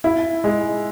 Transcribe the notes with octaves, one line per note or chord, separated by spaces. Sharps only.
E4
G#3